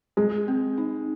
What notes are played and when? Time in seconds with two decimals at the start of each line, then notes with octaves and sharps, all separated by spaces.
0.17 G#3 G#4
0.48 C4
0.78 D#4